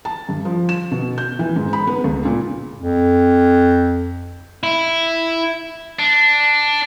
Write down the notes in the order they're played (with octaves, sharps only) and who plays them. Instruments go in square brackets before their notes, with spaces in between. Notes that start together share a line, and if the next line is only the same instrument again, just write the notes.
[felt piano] A5
G2
F3
E7
B2
G6
E3
G#2
B5
B3
C#2
A#2
[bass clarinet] F2
[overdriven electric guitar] E4
[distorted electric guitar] D4